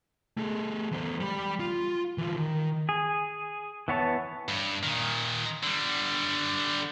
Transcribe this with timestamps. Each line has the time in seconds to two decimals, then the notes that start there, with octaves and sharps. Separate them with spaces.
0.37 A3 G#4
0.92 E2 C5
1.20 G3 B5
1.60 F4
2.18 E3 F4
2.37 D#3
2.89 G#4
3.88 E3 B3 C#5 A5
4.48 G2
4.83 A#2 D#3
5.63 D3 G3